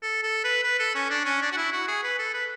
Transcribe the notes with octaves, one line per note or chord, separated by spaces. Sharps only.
A4
A4
B4
B4
A4
C#4
D4
C#4
D4
F#4
E4
F#4
G#4
B4
A4
B4